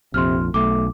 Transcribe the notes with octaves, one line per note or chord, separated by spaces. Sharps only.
A#1 F2 C3 C6 F6
B1 A3 D6